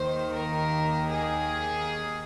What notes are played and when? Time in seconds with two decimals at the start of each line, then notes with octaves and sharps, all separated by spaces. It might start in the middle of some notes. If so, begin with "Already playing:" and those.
Already playing: D#2 D#3 A#3 C5
0.35 A#4
1.11 G#4